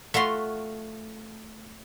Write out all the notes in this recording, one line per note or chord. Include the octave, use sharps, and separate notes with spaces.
A3 F4 F#4 C6